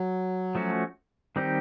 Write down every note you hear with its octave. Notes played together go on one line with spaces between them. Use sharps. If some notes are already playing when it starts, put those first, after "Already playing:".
Already playing: F#3
F3 A3 C#4 F#4
D#3 G3 C4 D#4 G4